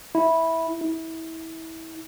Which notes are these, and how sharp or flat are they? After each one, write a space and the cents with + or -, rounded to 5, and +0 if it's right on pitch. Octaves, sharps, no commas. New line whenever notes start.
E4 -10
E4 -25